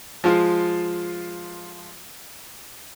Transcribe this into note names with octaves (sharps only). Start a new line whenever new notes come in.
F3 G#3 F4